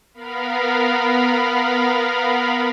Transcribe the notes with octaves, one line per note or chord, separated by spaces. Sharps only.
B3 A#4 F5 B5